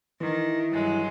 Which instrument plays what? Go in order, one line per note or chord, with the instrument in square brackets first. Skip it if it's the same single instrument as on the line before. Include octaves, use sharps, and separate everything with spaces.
[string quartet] D#3 [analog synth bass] E3
[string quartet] G2 F#3 G#3